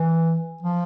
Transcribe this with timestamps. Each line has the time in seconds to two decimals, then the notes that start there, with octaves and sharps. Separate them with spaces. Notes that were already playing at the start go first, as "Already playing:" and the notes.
Already playing: E3
0.62 F3